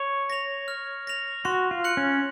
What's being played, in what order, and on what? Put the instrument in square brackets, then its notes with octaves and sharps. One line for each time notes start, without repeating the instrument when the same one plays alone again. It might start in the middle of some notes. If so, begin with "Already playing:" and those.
Already playing: [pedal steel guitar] C#5
[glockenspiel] A#6 F7
F6
A#6 F7
[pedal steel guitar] F#4 [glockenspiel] C6
[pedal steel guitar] F4
[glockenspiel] F#6 C#7 F#7
[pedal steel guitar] C#4